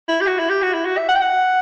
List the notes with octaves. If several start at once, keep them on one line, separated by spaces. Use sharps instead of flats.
E4
G4
F#4
E4
G4
F#4
E4
F#4
E5
F#5
G5
F#5